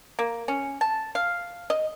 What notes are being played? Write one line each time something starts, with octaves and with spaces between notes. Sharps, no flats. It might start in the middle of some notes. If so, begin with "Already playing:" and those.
A#3
C#4
A5
F5
D#5